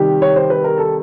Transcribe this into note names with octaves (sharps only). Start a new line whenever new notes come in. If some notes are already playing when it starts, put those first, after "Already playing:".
Already playing: C3 D#3 G3 G4
C#5
C5
B4
A#4
A4